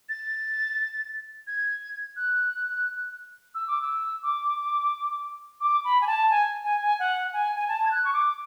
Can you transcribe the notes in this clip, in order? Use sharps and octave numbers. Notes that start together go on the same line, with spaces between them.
A6
G#6
F#6
E6
D6
E6
D6
D6
B5
G#5
A5
G#5
G#5
G#5
F#5
G#5
G#5
A5
G#6
F#6
C#6
D6